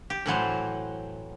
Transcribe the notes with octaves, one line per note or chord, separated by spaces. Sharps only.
G4
A2 E3 F#3 C5